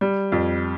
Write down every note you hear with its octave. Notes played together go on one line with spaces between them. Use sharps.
G3
F2